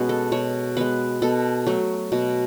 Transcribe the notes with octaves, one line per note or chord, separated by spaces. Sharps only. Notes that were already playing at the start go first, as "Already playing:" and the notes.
Already playing: B2 G#3 B3 C#4 F#4
A4
B2 C#5
G#3 B3 B4
B2 A4
F#3 A3
B2